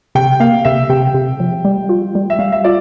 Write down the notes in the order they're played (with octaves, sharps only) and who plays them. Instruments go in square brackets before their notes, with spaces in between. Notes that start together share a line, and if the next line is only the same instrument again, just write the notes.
[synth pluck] C3 [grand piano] G5
[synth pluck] A#3 [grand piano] F5
[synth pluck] C3 [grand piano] E5
[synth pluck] C3 [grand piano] G5
[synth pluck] C3
F3
G3
F4
G3
[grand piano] E5
[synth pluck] G3 [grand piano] F5
[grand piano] E5
[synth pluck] F4 [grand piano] D5